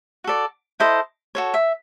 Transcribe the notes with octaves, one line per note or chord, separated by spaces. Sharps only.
F#4 A4 D5
E4 A4 C5 D#5
F#4 A4 C#5
E5